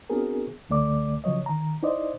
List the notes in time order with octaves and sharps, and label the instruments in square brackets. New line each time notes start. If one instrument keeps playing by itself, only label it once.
[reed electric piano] B3 C4 D4 F#4 G#4 A#4
C#2 D3 A3 D5 D6
C#3 F3 F#3 C#5 D#5
D#3 A#5
D#4 E4 C5 D5 D#5